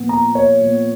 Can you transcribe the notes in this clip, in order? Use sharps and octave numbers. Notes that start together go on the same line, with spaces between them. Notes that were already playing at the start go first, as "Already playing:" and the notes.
Already playing: A#2 F3 B3
A#5
C#5
A#2 F3 B3